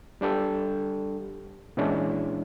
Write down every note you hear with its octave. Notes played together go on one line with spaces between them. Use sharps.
G3 D4 G4 A4
A#2 E3 G#3 C#4 D4 E4